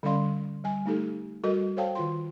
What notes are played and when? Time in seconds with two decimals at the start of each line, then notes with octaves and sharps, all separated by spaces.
0.03 D3 G3 C#4 D5 F5 C6
0.64 G3 G#5
0.86 A3 D#4 G4 A4
1.44 G3 F#4 A4 A#4 D#5
1.77 A4 C5 C#5 F5 G5 A5
1.95 D#3 F4 C6